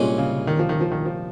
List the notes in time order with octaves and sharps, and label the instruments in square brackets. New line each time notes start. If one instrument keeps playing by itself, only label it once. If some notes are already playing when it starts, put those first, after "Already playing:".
Already playing: [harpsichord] C2 A#2 G#3 C#4
[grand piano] C#3
D#3
F3
D#3
F3
D#3
F3